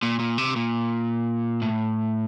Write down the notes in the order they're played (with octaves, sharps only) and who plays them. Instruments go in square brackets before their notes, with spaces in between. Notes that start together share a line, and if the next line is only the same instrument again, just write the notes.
[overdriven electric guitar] A#2
A#2
C3
A#2
A2